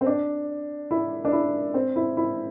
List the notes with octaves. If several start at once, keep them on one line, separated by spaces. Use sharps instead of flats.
C4
D4
E4
D4
E4
C4
E4
E4